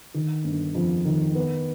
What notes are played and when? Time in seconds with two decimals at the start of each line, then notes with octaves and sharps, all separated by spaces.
0.14 D#3
0.44 G1
0.75 F2
1.05 D#3
1.35 B3